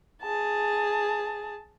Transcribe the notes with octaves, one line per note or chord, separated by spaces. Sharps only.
G#4 A5